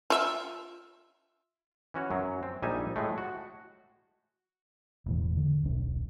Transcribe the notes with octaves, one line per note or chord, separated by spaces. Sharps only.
F4 E5
E3 C#4 F#4 C#5
F#2 F#3
C4
A#1 G3 D#4 E5 G#5
A2 G#3 A3
F#4
E1 A2 E3
D3
D#1 B1 D4